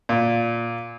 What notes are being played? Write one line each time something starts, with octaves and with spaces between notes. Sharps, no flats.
A#2